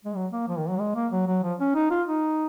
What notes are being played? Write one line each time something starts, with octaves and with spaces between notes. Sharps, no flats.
G#3
F#3
A#3
F3
D#3
F#3
G#3
A#3
F#3
F#3
F3
C#4
D#4
F4
D#4